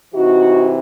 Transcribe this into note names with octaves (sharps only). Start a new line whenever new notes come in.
C3 E3 D#4 F#4